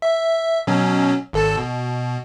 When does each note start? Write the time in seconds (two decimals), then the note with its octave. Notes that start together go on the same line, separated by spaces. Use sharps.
0.02 E5
0.67 B2 F#3 C#4
1.33 G#1 A4 A5
1.57 B2